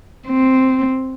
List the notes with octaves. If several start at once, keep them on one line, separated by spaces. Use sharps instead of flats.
C4